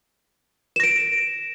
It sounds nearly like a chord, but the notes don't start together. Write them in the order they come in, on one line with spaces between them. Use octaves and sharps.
E7 A#6 D7